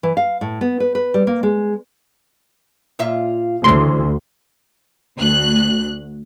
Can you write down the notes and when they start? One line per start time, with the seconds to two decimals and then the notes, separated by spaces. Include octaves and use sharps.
0.03 E3
0.17 F5
0.41 A2
0.61 B3
0.80 B4
0.95 B4
1.14 G3
1.27 A#3
1.43 G#3
2.99 A#2 F4 E5
3.64 D2 C#3 E3 C6
5.17 D2 F#6